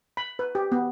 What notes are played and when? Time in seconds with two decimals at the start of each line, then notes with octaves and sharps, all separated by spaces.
0.17 B5
0.39 B4
0.55 G4
0.72 B3